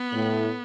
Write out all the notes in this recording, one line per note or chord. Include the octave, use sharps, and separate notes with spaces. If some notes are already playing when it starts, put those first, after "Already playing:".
Already playing: B3
A2